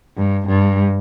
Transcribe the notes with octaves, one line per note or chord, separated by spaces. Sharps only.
G2
G2